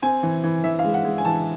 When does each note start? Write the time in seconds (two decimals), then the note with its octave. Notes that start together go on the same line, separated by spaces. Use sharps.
0.02 C4 G#5
0.23 E3
0.44 E3
0.64 E3 E5
0.79 F5
0.84 G#3
0.94 F#5
1.05 G#3
1.18 G#5
1.25 E3 A5